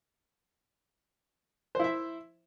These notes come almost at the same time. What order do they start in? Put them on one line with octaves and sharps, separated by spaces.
C5 E4 E5